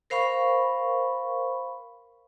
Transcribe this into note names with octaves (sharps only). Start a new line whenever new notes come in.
A#4 C5 F5 B5 C#6